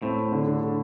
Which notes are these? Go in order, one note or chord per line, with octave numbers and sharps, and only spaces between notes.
A2 C4
C4
D3
D3
D3